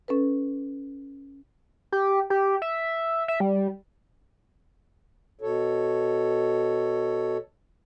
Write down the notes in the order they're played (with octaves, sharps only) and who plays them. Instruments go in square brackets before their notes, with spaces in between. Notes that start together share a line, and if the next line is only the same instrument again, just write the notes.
[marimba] C#4 A4 B4
[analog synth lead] G4
G4
E5
E5
G3
[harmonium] B2 A4 C#5